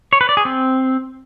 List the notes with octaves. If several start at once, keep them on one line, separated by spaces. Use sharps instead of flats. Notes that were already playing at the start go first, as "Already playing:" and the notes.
C#5
B4
D5
G#4
C4